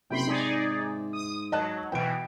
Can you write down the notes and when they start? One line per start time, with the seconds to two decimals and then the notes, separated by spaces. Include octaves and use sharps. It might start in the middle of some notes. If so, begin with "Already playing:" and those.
0.10 F#1 C3 G5 B5 C6
0.27 G#2 D#4 G#4 D5
1.13 D#6
1.52 F#3 D#5 A5 F#6
1.92 B2 E3 G5 D7